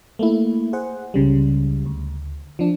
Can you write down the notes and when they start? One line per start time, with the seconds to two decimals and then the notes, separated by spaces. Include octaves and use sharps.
0.19 A3 A#3 E4
0.73 G#4 C5 F#5
1.14 C#2 C#3 G3
1.86 D2
2.59 F3 D4